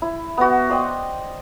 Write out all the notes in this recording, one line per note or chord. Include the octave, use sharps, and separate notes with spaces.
E4
B3 F#4
C5 D5 D#5 G5